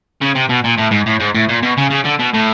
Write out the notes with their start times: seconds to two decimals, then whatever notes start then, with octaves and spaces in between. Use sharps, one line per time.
0.22 C#3
0.35 C3
0.49 B2
0.64 A#2
0.78 A2
0.91 G#2
1.06 A2
1.20 G#2
1.35 A2
1.49 A#2
1.63 B2
1.77 C#3
1.90 C#3
2.04 D3
2.19 B2
2.34 A2